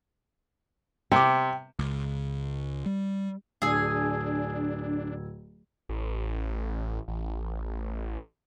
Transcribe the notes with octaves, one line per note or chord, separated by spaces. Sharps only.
C3 G5 D6
C#2
G3
D1 D4 G#4 G#5 E6 G#6
A1
A1